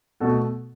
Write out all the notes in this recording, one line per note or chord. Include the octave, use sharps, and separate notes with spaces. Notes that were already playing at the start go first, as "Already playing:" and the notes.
B2 A3 F#4 A4